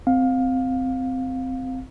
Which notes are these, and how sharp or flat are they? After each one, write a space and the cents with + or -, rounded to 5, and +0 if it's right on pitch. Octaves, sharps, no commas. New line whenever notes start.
C4 -15 F5 +20